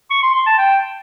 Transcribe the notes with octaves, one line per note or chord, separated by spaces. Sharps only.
C#6
C6
C6
A5
G5